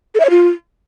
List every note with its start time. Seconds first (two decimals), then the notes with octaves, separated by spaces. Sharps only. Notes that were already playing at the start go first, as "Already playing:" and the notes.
0.15 A4
0.20 E5
0.25 C#5
0.30 F4